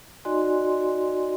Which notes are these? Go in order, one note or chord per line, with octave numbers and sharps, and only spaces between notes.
D#4 F#4 D5 D#5 G#5 C6